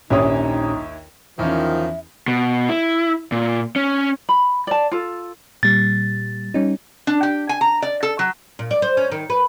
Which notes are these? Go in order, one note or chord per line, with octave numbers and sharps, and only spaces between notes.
A#1 D#2 C#4 D#4 E4 G4 C#5 D#6
E2 D#3 F3 C#4 E5
B2
E4
A#2
C#4
B5
D5 A5
F4 A4
A#2 G3 A6
G3 C#4 D#4
D4
G4
G#5
A#5
D5
A4
F#3
A#2
D5
C5
C#4
D#3
B4